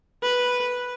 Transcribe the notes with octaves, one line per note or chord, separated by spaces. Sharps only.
B4